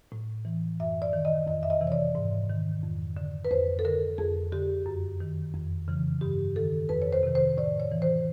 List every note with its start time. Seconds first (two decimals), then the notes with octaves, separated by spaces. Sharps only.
0.12 A2
0.45 E3
0.80 F#2 E5
1.02 D5
1.13 D#3
1.25 D#5
1.47 F2 D#5
1.63 E5
1.70 D#5
1.81 C3 E3
1.87 C#5
1.92 D5
2.15 G#2
2.50 D#3
2.83 F2
3.17 D3
3.45 B4
3.51 F2 C5
3.79 A4
3.85 D3 A#4
4.18 F2 G#4
4.52 D3 G4
4.86 F#2
5.20 D#3
5.54 F2
5.88 C#3 E3
6.21 G2 G4
6.56 D#3 A4
6.89 F2 B4
7.02 C#5
7.13 C5
7.23 C3 D#3
7.35 C5
7.57 A2 D5
7.80 C#5
7.92 E3
8.02 C5